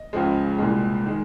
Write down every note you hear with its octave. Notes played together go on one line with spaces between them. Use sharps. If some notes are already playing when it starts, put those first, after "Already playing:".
Already playing: D#5
C#2 C#3 F3 G#3
C2 A#2 G#3
D#3 G#3